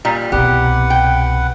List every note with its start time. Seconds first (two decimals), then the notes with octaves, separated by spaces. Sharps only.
0.05 A#2 G3
0.32 C2 B2 G4 B4 F#5
0.90 G5